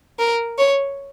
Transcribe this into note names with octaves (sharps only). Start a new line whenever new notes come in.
A#4
C#5